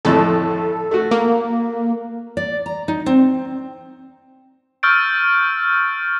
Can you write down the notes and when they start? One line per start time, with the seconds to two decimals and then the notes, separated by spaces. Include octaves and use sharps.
0.05 G#1 F2 A2 A4
0.91 A3 F#4
1.11 A#3
2.37 D5
2.66 A#5
2.88 D#4
3.06 C4
4.83 C#6 E6 F6 G6 A6 D7